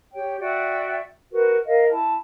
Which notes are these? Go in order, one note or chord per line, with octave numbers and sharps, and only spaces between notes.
G4 C#5 G5
F#4 D5 E5 G5
F#4 A#4 B4
A#4 D#5 F5
E4 A5